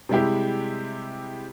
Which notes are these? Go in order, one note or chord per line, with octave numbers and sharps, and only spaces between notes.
C3 G3 G#3 E4 G4